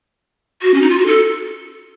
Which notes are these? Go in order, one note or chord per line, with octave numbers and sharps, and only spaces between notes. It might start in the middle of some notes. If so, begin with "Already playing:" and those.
F#4
C#4
D#4
F4
F#4
A4